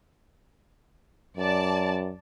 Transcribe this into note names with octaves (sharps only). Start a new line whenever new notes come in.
F#2 D5 A5